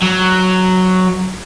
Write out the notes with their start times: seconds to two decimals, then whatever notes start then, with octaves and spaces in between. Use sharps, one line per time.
0.02 F#3